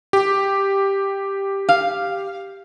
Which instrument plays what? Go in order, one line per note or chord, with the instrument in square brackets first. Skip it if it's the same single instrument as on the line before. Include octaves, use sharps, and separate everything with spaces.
[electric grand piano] G4
[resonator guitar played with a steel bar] F5